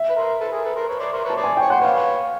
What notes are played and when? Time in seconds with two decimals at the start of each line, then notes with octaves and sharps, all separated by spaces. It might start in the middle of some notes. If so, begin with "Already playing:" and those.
Already playing: E5
0.09 B4
0.16 A#4 C5
0.40 A4 B4
0.52 G#4 A#4
0.64 A4 B4
0.76 A#4 C5
0.88 B4 C#5
1.00 C5 D5
1.13 A#4 C5
1.24 B4 C#5
1.30 A5
1.36 C5 D5
1.44 G#5
1.57 C#5 G5
1.70 C5 F#5
1.81 B4 C#5 F5